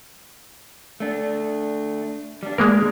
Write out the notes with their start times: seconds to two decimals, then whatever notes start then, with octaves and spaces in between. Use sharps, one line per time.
1.00 A3 D4
2.43 G3 D4
2.58 G#3 A#3 A#4